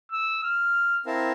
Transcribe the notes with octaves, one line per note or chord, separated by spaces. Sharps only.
E6
F6
C4 E4 A#4 F5 A5